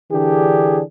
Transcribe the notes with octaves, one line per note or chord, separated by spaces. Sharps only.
D3 E3 D4 G4 G#4